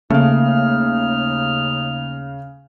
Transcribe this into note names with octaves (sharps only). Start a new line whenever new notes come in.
D#2 C#3 A3 A#3 D#4 F6